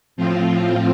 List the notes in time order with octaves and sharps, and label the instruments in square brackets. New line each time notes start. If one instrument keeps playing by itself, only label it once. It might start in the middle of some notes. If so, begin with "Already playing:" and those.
[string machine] A2 F3 C4 F4